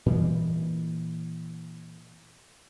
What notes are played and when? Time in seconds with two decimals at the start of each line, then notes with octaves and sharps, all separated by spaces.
0.06 A#2 E3 G3 G#3